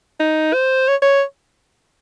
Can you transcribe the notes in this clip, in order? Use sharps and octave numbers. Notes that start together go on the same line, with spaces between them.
D#4
C5
C#5
C#5